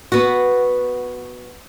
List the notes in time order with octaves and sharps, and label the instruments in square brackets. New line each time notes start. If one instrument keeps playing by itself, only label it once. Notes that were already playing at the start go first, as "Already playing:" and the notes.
[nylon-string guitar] B3 F#4